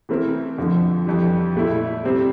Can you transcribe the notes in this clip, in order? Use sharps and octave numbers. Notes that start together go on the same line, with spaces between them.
E3 A3 C4 E4 A#4
F2 D3 F3
F2 E3 G3
A#2 A3 E4
C3 G3 C4